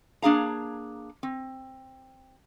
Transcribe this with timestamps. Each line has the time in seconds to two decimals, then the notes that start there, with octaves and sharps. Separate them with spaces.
0.22 A#3 D4 G#4 F5 A#5
1.23 C4